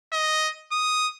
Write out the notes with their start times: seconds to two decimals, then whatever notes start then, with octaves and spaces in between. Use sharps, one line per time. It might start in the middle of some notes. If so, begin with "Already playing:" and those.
0.13 D#5
0.72 D#6